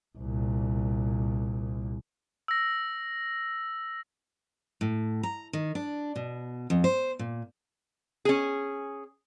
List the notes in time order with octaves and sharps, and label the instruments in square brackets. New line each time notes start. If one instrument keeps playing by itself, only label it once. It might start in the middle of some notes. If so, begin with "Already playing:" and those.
[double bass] C2 A#2
[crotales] E6 A#6
[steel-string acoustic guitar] A2
A#5
D#3
D4
B2
F2
C5
A#2
[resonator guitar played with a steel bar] C#4 G#4